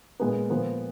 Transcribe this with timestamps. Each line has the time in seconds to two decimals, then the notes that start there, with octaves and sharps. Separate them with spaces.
0.20 A#2 G#3 B3
0.50 A#2 F3 B3